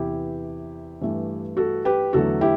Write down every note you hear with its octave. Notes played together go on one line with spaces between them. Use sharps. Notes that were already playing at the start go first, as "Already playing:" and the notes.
Already playing: E2 C3 E3 E4 G4
G2 E3 A3
F#4 A4
G4 B4
E2 D3 F#3 A3 F#4 A4
E4 G4